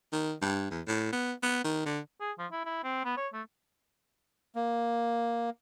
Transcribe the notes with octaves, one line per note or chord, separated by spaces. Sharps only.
D#3
G2
E2
A2
B3
B3
D#3
D3
G#4
F3
E4
E4
C4
B3
C#5
A3
A#3